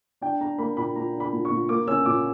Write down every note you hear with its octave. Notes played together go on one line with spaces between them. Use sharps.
D4 G5
D4 A#5
A#3 B5
A#2 B5
A#2 A#5
D4
B5
A#2
C#6
A#2
A#3 D6
C#4 E6
A#2 D6